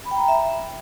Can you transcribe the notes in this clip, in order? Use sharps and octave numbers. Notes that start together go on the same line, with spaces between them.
B5
G5
A#5
B5
E5